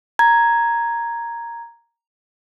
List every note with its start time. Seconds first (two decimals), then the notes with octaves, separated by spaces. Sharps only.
0.19 A#5 G#6